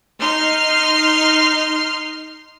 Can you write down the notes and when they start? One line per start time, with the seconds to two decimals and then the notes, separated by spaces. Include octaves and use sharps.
0.19 D#4 C6 F6 C7